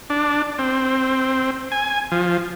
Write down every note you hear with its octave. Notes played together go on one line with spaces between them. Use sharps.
D4
C4
G#5
F3